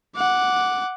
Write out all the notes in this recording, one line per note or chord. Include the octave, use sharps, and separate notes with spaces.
F#5 D6